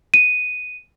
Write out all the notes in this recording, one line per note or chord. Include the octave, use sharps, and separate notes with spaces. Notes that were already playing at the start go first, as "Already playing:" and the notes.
D#7